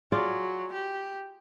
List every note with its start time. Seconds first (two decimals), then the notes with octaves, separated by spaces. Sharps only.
0.12 F#3 F4 G#4 D5
0.73 G4